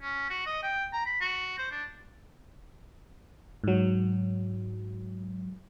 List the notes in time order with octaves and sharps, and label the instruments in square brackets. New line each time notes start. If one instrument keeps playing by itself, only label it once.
[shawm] C#4
F#4
D#5
G5
A#5
B5
F#4
C5
D4
[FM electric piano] G#2 F#3